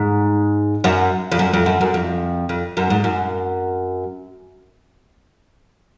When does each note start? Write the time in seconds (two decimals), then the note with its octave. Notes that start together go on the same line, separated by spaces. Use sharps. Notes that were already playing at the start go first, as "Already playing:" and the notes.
Already playing: G#2
0.84 F#2
1.32 F2
1.39 F#2
1.54 F2
1.66 F#2
1.81 F#2
1.94 F2
2.49 F2
2.77 F#2
2.90 G#2
3.04 F#2